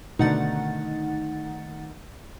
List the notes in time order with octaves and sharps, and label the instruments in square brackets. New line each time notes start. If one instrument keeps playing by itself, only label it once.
[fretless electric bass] B2 D3 [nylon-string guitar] D#3 A3 [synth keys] D#4 F#5 A6